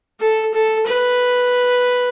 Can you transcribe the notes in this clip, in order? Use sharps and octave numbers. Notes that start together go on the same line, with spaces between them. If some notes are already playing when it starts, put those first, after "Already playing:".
A4
A4
B4